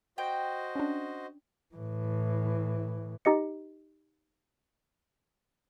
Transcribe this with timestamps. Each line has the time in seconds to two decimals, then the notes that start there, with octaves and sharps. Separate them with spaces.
0.18 F#4 C5 D#5 G5
0.76 C#4 D4
1.75 A2 E3
3.25 D#4 G4 D#5 C#7